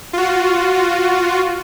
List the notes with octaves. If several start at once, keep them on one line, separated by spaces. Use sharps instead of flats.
F4 F#4